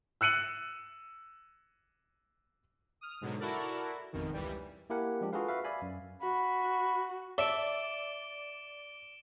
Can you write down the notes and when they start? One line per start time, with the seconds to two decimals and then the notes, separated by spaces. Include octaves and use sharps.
0.21 E6 F#6 C#7 D#7 F#7
3.01 D#6 F6
3.21 G#2 B2 D3 F#3
3.40 E4 F#4 A4 A#4 D5
4.13 G#1 F2 B2 D#3
4.33 C#2 E3 G3
4.90 A#3 E4 G4 A#4 F#5 G#5
5.21 F3 G#3 D4 G4
5.33 F4 F#4 G#4 A4 B4 F5
5.48 F#4 B4 E5 F5
5.64 D5 E5 F5 G#5 B5
5.82 F#2
6.22 F#4 B5
7.38 A4 D5 E5 D7 E7 G7